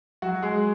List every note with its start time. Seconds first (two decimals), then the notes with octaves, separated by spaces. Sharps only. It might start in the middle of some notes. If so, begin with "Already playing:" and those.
0.22 F#3 F#4
0.42 G#3 G#4